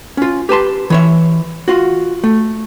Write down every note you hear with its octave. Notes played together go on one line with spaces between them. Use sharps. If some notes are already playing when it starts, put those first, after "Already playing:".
C#4 F4
G4 B4 A5 C6
E3 C#5 E5
F4 F#4
A3